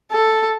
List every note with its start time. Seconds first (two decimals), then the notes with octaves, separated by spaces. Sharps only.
0.12 A4